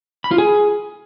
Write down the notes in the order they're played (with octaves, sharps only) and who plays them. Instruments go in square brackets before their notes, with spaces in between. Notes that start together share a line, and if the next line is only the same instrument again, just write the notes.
[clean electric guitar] B5
F4
G#4